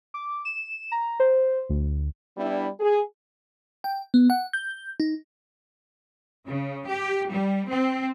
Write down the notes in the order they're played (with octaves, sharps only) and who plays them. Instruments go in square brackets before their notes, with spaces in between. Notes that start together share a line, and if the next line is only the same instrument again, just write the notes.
[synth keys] D6
E7
A#5
C5
D2
[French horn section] G3 B3 D4 E4
G#4
[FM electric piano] G5
B3
F#5
G6
D#4
[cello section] C#3
G4
G3
C4